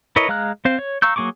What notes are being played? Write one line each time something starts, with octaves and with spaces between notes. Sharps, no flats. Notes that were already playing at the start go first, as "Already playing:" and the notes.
E4 A#4 B4 C#5 D#5
G#3 F5 A#5 F6 F#6
C4 C5 F5
C#5
F5 A#5 C#6 E6 G6
F#3 A#3 G#4 C#6 D6